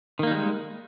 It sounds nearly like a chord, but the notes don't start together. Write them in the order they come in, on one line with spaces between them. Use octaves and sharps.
D#3 A#3 D#4 G3 G#3